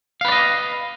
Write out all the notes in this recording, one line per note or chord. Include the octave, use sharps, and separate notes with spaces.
B4 D5 D#5 F5